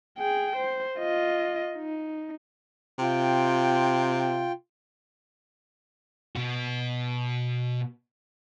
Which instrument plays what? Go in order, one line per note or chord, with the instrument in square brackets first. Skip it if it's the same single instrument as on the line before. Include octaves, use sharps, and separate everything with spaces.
[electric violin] G#4 G5
C5
F4 D#5
D#4
[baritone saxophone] C3 [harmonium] F4 G5
[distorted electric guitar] B2 F#4